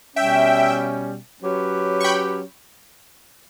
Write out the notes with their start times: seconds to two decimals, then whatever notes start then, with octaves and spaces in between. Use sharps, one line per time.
0.16 B2 G3 C#4 E5 G5
1.42 F#3 C#4 G4 B4
2.00 C#6
2.04 G5 B5